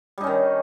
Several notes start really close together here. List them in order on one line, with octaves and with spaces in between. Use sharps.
G3 D#4 C#4 D#3